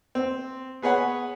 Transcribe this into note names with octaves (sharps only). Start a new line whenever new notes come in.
C4
B3 G#4 B4 C#5 F#5